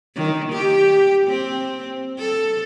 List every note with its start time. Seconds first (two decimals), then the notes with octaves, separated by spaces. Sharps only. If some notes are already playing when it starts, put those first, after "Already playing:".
0.16 D#3
0.53 G4
1.27 C4
2.19 A4